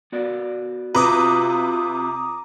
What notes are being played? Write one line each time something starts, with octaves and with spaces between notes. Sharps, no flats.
B3 F#4 D5
C3 F4 B4 A#5 D6 D#6